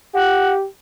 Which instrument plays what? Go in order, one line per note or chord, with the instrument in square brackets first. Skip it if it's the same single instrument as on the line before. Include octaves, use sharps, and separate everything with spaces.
[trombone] G4 [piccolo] F#5